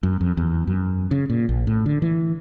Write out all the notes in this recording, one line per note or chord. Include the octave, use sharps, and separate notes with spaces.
F#2
F2
E2
F#2
C#3
A#2
A#1
A2
D3
E3